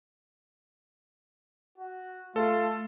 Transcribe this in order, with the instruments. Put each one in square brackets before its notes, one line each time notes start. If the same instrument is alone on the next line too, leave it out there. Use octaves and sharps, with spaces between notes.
[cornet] F#4
[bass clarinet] A3 [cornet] F4 [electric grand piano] A4